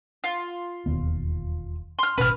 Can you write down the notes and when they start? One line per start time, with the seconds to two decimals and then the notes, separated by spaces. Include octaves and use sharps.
0.24 F4
0.86 E1 D#2 B3
1.99 C6 F6
2.18 G#1 B2 C#4 B4 F6